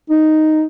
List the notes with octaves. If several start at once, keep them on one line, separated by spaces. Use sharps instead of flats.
D#4